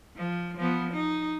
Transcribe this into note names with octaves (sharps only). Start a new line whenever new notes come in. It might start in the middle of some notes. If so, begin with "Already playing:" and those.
F3
F3 B3
D#4